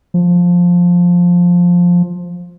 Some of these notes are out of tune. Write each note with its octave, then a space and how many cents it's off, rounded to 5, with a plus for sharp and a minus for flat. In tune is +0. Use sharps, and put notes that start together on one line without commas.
F3 +10